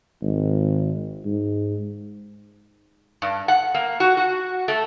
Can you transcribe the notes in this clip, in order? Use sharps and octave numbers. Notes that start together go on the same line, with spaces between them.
G#1
G#2
G2
F#5
A#3
F#4
F#4
A3